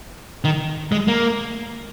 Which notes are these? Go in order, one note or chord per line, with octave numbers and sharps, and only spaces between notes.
D#3
G#3
A#3